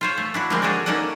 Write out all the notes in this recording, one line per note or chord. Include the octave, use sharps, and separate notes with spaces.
F4 C5 C#5
A3
D4 E4 F#4
D3 F3 G3 G#3 A#3 C4
F#4 G#4 A4 C#5 D5
A#3 C#4 D#4 A4 D5 F#5